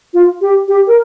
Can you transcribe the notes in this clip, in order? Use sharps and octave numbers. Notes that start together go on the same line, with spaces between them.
F4
G4
G4
A#4